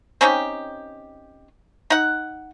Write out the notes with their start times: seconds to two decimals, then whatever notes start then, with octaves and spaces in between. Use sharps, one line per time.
0.21 C4 C#4 D#4 G4
1.90 D#4 F#5